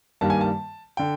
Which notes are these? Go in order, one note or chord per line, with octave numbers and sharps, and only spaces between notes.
G2 D#3 G3 A#3 A5
G#5
A5
D3 G5